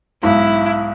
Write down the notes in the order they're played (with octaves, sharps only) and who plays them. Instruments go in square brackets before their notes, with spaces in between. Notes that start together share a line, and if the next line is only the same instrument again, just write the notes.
[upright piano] B1 G#2 [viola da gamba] E4